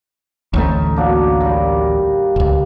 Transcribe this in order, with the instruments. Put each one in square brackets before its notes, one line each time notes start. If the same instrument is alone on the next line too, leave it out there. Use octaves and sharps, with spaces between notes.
[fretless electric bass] A1 D2 A3 [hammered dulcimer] C#4 D#4
[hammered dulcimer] F#3 A#3 D4
D#3 G3
[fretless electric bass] D#1 C#2